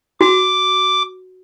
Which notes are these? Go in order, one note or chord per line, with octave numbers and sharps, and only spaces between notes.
F#4 D6